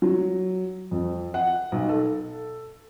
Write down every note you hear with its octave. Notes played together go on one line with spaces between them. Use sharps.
F#3
F2
F#5
B1
A4